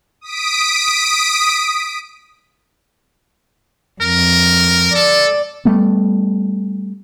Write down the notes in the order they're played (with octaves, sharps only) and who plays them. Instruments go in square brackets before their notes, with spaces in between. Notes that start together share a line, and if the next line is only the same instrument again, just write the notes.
[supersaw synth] D#6 B6 D7
[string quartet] F2 [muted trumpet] A#4
[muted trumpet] A4 [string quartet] D5
[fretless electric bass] G3 A3 B3